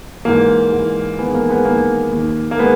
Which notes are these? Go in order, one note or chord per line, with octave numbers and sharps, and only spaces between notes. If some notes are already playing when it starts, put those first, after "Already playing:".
G#2 E3 A#3
G#2 E3
E2 D#3 G#3 B3
A#3
G#3 B3
E2 D#3 A#3
D#2 D#3
A#3
G#3 B3